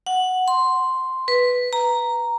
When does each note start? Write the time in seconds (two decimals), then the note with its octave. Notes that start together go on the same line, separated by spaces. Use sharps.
0.06 F#5
0.48 C6
1.28 B4
1.73 A#5